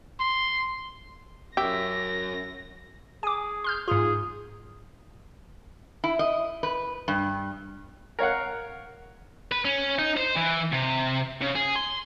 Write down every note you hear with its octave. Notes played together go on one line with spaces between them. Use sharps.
C6
F#2 G4 E5 A#6
G#4 G#5 D6
C6 F6 G6
G#2 F4 G#4
E4
D#5
B4
G2
A#4 C#5 F5 F#5
B4
C#4
D#4
C5
E3
C3
C#3
G#4
C6